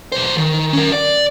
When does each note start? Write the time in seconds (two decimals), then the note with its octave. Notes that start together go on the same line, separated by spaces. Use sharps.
0.12 B1 C5
0.38 D#3
0.73 C#4 A#4
0.92 D5